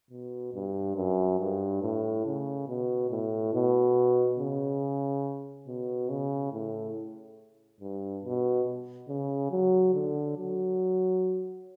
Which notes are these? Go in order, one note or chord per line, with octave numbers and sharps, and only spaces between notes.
B2
G2
F#2
G2
A2
C#3
B2
A2
B2
C#3
B2
C#3
A2
G2
B2
C#3
F#3
D3
F#3